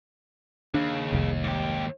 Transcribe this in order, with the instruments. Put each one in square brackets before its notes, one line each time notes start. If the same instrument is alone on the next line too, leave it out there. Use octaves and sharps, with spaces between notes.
[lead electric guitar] D#2 [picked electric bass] D4 [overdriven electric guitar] G#4 F5
[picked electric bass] F1 C2
[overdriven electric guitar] G#2 G4